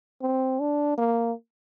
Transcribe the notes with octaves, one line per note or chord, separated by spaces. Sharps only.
C4
D4
A#3